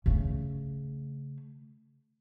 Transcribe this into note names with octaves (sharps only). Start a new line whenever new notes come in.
C#3 A3